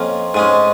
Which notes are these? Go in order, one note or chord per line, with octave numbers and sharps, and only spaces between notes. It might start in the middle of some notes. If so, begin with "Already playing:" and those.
Already playing: F2 F3 A#3 C#4 C#5 D#5
G#2 G#3 C#4 D#5